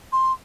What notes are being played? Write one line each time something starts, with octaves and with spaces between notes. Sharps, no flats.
C6